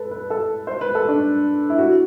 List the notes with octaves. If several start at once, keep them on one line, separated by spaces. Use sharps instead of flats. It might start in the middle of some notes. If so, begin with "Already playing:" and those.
Already playing: A4 B4
B4
A4
C5
B4
A4
D4
E4
F#4